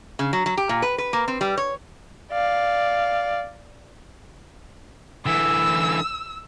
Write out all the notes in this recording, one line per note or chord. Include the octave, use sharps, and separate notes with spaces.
C#3
F#3
F#3
G4
A#2
B4
B4
A#3
C4
G3
C#5
D5 F5
D3 E3 E6